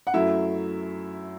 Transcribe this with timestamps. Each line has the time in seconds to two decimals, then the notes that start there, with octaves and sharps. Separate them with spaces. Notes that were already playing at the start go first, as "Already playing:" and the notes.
0.07 F#5
0.14 F#2 F#3 A3 E4 E5